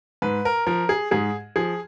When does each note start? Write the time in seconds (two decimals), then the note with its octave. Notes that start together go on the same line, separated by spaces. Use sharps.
0.22 G#2 B4
0.45 A#4
0.66 F3 A#4
0.89 G#4
1.11 G#2 G#4
1.56 F3 G#4